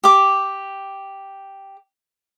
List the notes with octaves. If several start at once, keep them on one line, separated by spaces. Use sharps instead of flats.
G4 D6